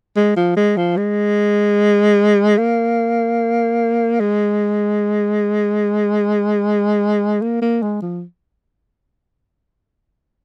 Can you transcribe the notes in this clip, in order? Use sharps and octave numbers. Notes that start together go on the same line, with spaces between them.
G#3
F3
G#3
F3
G#3
A#3
G#3
A#3
A#3
G#3
F3